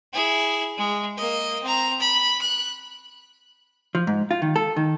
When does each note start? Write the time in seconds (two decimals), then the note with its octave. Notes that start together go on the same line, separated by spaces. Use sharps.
0.13 E4 G#4
0.77 G#3
1.17 A#3 D#5
1.63 C4 A#5
2.00 B5
2.41 F#6
3.95 F3
4.07 G#2
4.31 F4
4.42 D#3
4.56 A4
4.77 D#3